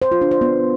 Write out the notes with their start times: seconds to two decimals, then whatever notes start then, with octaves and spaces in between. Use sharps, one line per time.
0.02 C5
0.12 F4
0.21 D4
0.31 C5
0.41 B3